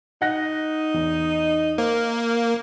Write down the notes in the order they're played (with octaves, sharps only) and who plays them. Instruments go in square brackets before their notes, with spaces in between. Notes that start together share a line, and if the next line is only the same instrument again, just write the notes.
[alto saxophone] D#4 [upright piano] F#5 F#6 A#6
[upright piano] E2
[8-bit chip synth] A#3 [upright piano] C5